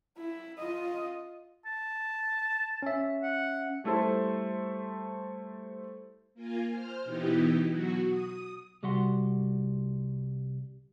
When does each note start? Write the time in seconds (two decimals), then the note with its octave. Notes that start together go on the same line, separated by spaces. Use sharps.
0.17 E4
0.58 F4 D#5
1.66 A5
2.82 C#4 E5
3.23 F#5
3.84 G3 A3 E4 A4 C5
6.34 A#3 F4 G#5
6.71 C5 F6
7.04 B2 E3 B3 D#4 E4 G4
7.66 B2 F#3 F#4
8.06 D#6
8.83 C2 G3 F#4 G4 F#5 C6